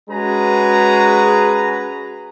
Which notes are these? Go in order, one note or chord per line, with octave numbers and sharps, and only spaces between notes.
G#3 C#4 F#4 G#4 B4 A#5